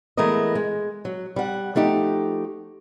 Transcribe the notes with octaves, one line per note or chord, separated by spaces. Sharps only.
E3 G#3 A3 B3 A#4 D#5
G#3
F#3
G3 F#5
F3 A3 D#4 G4